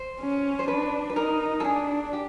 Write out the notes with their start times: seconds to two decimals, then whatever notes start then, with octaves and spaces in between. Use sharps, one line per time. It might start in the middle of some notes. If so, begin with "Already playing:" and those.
Already playing: C5
0.20 C#4
0.59 C5
0.68 D4 B4
1.10 B4
1.16 D#4 A#4
1.60 A4
1.64 D4 G#4
2.13 G4